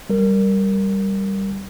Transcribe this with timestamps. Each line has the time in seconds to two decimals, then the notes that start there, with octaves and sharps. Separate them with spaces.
0.10 G3 A#4